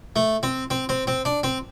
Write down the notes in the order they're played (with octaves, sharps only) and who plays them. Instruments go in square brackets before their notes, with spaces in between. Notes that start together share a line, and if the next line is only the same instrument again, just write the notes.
[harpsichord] A3
C4
C4
C4
C4
D4
C4